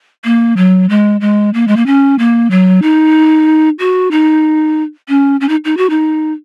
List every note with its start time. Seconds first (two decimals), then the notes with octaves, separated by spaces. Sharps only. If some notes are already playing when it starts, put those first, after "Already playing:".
0.25 A#3
0.57 F#3
0.90 G#3
1.21 G#3
1.54 A#3
1.68 G#3
1.77 A#3
1.86 C#4
2.19 A#3
2.51 F#3
2.82 D#4
3.79 F#4
4.11 D#4
5.09 C#4
5.41 C#4
5.49 D#4
5.65 D#4
5.77 F#4
5.90 D#4